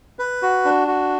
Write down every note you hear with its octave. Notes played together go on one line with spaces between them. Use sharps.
B4
F#4
D4
F#4